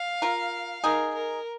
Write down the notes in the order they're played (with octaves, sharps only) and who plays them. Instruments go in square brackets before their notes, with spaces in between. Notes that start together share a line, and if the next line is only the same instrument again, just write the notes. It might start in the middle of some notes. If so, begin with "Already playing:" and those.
Already playing: [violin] F5
[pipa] F4 A#4
[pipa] D#4 G#4 [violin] A#4
[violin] A#4